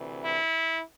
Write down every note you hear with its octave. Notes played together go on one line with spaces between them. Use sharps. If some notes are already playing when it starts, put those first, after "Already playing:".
Already playing: D2 C3 E3
E4